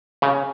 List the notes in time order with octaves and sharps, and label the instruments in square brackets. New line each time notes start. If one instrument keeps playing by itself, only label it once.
[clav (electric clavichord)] C#3